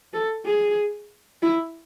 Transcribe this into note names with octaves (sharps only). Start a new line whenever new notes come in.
A4
G#4
E4